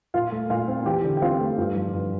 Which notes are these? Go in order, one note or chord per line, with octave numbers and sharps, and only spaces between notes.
A#2 F4 F5
A3
A#2 F4 F5
C4
E2 G4 G5
D3
G5
C4 F4 F5
A3
G2 F4 F5
F3
G2